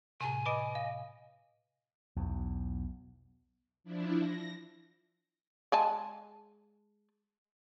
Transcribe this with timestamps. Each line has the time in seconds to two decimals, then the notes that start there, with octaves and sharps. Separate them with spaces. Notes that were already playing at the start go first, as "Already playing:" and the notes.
0.21 A2 C3 G#5
0.46 B4 D#5 B5 D6 D7
0.75 F5
2.16 B1 E2
3.84 F3 D4 E4
4.17 A#6
5.72 G#3 G#5 A5